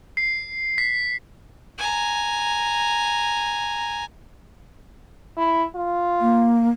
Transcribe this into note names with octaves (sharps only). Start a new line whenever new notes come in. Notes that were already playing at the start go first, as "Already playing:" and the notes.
C7
B6
G#5 A#5
E4
F4
A#3